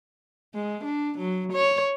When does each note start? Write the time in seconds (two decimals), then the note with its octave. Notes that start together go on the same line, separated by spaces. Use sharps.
0.54 G#3
0.84 D4
1.18 F#3
1.52 C#5